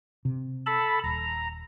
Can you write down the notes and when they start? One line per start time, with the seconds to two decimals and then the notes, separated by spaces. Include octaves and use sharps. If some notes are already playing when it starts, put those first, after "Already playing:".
0.25 C3
0.66 A4 A5 B5
1.03 D#1 A#5